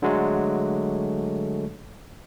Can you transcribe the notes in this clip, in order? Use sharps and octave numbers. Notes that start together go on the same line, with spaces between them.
D3 F#3 G#3 A3